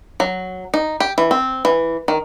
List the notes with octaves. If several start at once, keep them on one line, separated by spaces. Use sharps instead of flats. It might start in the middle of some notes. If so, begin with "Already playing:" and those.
F#3
D#4
G4
E3
C4
E3
D#3